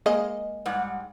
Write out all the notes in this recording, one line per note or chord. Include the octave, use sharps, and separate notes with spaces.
G#3 A#3 D#5
G#2 G3 F#5